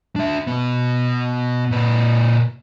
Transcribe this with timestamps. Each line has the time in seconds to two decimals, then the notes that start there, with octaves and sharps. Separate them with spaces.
0.16 D4 E5
0.47 B2 B3
1.71 A#2 B4